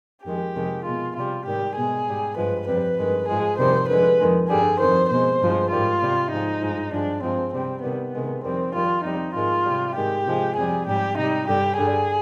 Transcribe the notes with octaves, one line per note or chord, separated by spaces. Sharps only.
F2 D#3 G#3 G4
F2 C3 D#3 G#3
B2 G#3 F4
C3 G3 F4
G#2 D#3 G3 G4
B2 G#3 G#4
G#2 G3
G2 F3 G#3 B4
F2 C3 G3 B4
G2 D#3 G#3
G#2 F3 G#3 G#4
F2 C3 D#3 G3 C5
F2 D3 G#3 B4
F2 D#3 G#3
G2 D3 G3 G#4
F2 C3 D#3 C5
B2 G#3 C5
G2 F3 G#3
G#2 D#3 G3 F4
C3 G3
G#2 F3 G#3 D#4
G2 F3 G#3
G2 F3 G#3 D4
G2 F3 G#3 C4
C3 G3 C4
C3 D#3 G3 B3
C3 D#3 G#3
F2 D#3 G3 C4
F2 D#3 G3 F4
F2 C3 G3 D#4
G#2 D#3 G#3 F4
C3 G3
G#2 D#3 G#3 G4
C3 F3 G#3
F2 C3 G3 G#4
G#2 G3 G4
C3 G3 D#4
G2 D3 G3 G4
G2 D3 G3 G#4